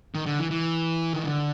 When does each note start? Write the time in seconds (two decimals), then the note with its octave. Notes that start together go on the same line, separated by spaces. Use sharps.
0.15 D#3
0.26 D3
0.40 E3
0.51 E3
1.13 D#3
1.24 D3